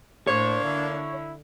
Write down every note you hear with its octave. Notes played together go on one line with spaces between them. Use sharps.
A2 A#3 D4 C5 C#5
D3 E4